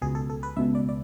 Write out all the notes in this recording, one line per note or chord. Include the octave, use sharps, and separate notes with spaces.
C#2 B2 G#4
A4
A4
B4
C#2 B2 E5
D5
D5